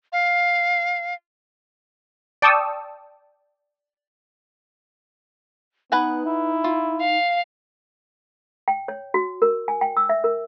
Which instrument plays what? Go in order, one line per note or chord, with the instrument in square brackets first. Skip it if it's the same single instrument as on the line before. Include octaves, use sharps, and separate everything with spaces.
[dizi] F5
[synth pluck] D5 G5 A5 C#6 D#6 E6
[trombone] B3 [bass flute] D#4 [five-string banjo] B4 F#5 G#5
[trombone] E4
[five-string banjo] F4
[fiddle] F5
[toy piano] G5
C#5
F#4
A#4
G#5
G5
E6
E5
A#4